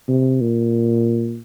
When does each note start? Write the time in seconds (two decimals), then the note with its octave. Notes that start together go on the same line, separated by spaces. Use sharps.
0.08 C3
0.41 A#2